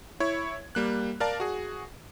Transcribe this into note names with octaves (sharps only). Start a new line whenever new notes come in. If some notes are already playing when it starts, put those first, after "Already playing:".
E4 C#5 C#6 G#6
G3 A#3 F#6
A#4 D5 F5 A5
F#4 G#4